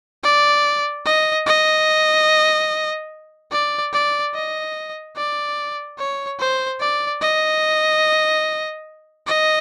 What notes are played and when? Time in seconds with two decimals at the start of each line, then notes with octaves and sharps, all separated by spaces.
0.24 D5
1.06 D#5
1.47 D#5
3.52 D5
3.93 D5
4.34 D#5
5.17 D5
5.99 C#5
6.40 C5
6.80 D5
7.22 D#5
9.27 D#5